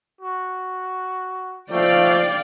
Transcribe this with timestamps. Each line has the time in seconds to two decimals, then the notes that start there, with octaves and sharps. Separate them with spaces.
0.21 F#4
1.71 F3 A3 D5 F5 G5